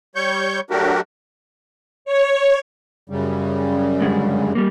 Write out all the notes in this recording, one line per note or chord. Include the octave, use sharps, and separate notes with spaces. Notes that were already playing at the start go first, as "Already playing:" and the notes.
G3 C#5 C#6 G6
F#3 A3 D4 F#4 G4 A#4
C#5
F#2 C#3 G3
G2 D3 G#3
G3 A#3